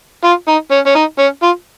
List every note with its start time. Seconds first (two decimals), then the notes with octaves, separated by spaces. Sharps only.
0.24 F4
0.48 D#4
0.71 C#4
0.86 C#4
0.95 D#4
1.19 C#4
1.42 F4